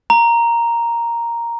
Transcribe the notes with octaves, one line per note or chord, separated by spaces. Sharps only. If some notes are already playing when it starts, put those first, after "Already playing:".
A#5